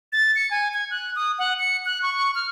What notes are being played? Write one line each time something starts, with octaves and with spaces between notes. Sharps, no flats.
A6
C#7
G#5
G#6
F#6
D#6
F#5
C#7
F#6
C#6
F6